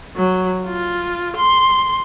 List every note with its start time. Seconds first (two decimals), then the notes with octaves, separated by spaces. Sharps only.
0.16 F#3
0.66 F4
1.36 C6